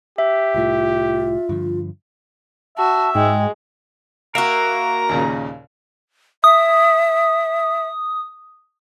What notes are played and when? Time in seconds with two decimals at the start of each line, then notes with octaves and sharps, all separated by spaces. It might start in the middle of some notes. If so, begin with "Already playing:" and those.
0.18 G4 E5
0.54 C2 A2 F4
1.49 G2 D3 F3
2.78 F#4 E5 A5
3.15 G#2 G#3 G5
4.35 A#3 F#4 A#4 E5 A#5
5.09 D#2 A#2 C#3
6.44 E5 D#6